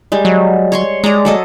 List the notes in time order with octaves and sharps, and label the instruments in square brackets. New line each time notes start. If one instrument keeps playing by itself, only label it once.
[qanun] G3 G#3
[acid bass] F#3
[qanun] C#5 C6 C#6
[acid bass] G#3 [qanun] D5 A#5
[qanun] F#3 A4 D#5